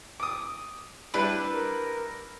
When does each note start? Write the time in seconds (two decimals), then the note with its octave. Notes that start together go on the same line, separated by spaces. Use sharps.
0.20 D6 D#6
1.14 G3 D4 E4 B4
1.52 A#4